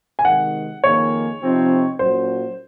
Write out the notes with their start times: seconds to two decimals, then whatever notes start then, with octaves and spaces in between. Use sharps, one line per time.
0.19 G#5
0.25 C3 D#3 G#3 F#5
0.83 F2 D#3 A#3 F4 G#4 C#5
1.41 C3 F3 C4 D#4
1.99 A#2 F#3 C#4 C5